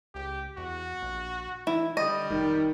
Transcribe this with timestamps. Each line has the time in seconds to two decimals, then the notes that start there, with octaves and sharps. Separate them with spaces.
0.15 C#2 G4
0.58 E2 F#4
1.03 A#1
1.67 E3 E4
1.97 D3 G3 D#5
2.30 F1 D#3